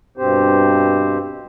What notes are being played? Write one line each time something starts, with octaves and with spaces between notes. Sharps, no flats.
G2 B2 C4 G4 C5